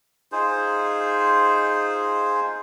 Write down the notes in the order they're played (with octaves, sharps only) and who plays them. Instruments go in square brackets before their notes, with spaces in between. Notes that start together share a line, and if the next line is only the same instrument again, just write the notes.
[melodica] D#4 F4 G#4 C5